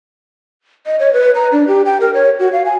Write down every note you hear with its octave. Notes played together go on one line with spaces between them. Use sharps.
D#5
C#5
B4
A#5
D4
G4
G5
A#4
C#5
F#4
F5
G#5